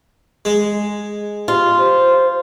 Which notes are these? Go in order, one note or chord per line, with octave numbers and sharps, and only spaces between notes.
G#3
F4 G4
C5